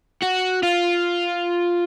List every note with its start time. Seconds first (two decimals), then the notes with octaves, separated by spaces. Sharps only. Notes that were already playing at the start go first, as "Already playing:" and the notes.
0.22 F#4
0.63 F4